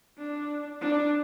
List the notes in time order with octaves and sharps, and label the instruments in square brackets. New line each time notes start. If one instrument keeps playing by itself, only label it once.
[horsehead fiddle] D4
D4